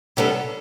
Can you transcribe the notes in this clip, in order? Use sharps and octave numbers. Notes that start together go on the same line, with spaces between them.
C3 G3 B3 D4 A4